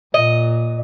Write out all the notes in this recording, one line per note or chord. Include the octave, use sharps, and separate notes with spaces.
A#2 D#5